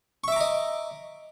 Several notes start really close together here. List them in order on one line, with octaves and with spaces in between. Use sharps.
C#6 E5 D6 A#5 D#5